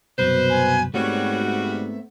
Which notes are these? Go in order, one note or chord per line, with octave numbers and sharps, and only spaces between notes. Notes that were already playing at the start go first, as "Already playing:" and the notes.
C2 F#2 B2 B4 C5
G#5
G#2 G3 A3 B3 C4 F#4 C#5
E5